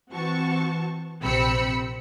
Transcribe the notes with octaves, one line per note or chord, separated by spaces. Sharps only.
E3 C4 F#4 A5 C#6
A#1 C3 C4 B5 E6 C#7